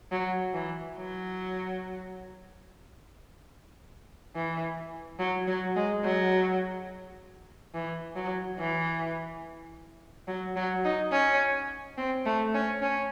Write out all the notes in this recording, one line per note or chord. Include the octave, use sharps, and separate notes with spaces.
F#3
E3
F#3
E3
F#3
F#3
G#3
F#3
E3
F#3
E3
F#3
F#3
D#4
C#4
C4
A3
C#4
C#4